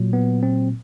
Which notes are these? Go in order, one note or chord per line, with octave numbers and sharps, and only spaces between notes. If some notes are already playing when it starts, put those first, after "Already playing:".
Already playing: A#2 F#3
B3
C4